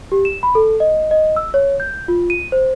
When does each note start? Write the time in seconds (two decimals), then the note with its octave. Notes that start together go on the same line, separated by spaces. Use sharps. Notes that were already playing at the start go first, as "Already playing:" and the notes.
0.12 G4
0.25 E7
0.43 B5
0.55 A4
0.80 D#5
1.11 D#5
1.36 E6
1.54 C#5
1.80 G6
2.08 F4
2.30 D#7
2.52 C5